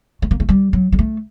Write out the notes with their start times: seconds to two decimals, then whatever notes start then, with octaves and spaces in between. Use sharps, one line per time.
0.22 A3
0.31 A#3
0.40 A3
0.49 G3
0.73 F#3
0.92 G3
0.99 A3